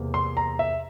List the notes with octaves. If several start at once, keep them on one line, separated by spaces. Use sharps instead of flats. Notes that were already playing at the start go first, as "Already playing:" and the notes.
Already playing: E2 C3 A#3
C6
A#5
E5